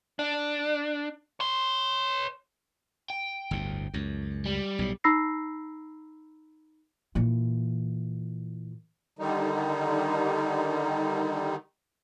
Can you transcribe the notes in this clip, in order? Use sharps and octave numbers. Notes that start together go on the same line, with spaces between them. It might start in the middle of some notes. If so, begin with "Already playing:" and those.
D4
C#5 C6
G5
G1 D2 A2
C#2 F#2
G3
B1 A2
D#4 A#5 B5 E6 A#6 C7
A#2 E3
D3 D#3 G3 D#4